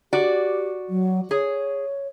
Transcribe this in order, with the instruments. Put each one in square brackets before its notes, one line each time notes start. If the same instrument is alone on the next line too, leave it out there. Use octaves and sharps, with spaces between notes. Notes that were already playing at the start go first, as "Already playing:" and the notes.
[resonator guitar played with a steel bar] F#4 D5 [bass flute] G4
[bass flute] F#3
[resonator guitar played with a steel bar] G#4 [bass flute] C#5